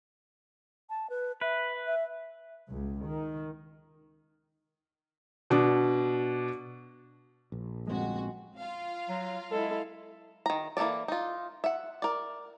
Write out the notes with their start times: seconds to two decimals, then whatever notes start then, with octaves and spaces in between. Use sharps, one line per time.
0.90 A5
1.10 B4
1.41 B4 E5
1.87 E5
2.69 C#2
3.04 D#3
5.50 B2 D4
7.52 A#1
7.87 G1 F2 G#3 C4 F#4
8.58 F4 F5
9.09 F#3
9.51 G#3 E4 A4
10.46 D#3 A#5
10.77 E3 A#3 D#4 A4 D5
11.08 D#4 F4
11.64 E5 F#5
12.02 A#4 D5